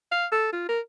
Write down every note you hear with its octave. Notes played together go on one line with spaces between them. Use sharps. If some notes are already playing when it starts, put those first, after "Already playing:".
F5
A4
F4
A#4